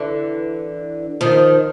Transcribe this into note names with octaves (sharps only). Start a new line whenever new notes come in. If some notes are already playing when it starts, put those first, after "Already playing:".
Already playing: D3 E3
D#3 F3